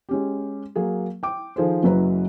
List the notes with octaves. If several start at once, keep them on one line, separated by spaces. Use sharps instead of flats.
G#3 C#4 G4
F#3 A#3 G#4
G5 D6
D#3 F3 G#4 A4 C5
F#1 F#2 F#3 E4 B4 A#5